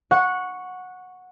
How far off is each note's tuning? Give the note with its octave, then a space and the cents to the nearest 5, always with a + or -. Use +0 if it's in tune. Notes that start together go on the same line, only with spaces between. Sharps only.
F#5 -15 C#6 +0